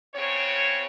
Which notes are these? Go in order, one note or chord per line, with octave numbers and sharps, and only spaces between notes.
E2 C#3 C4 C#5